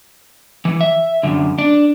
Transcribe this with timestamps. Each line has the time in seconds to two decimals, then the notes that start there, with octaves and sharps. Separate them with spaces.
0.65 E3
0.81 E5
1.23 F#2 D3
1.58 D4